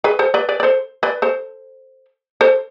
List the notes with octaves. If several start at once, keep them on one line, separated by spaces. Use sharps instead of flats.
G#4 B4
A4 C5
B4 D5
B4 D5
D5
A4 C5
B4 D5
A4 C5
A4 C5